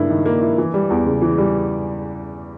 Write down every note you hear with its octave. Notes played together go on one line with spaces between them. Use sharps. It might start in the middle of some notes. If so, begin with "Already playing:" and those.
Already playing: G2 C#3 A#3 E4
D#3
A#3
E4
E3
G3
E2
C#3
E3
G3